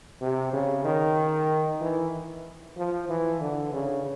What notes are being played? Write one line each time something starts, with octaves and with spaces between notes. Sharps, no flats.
C3
C#3
D#3
E3
F3
E3
D3
C#3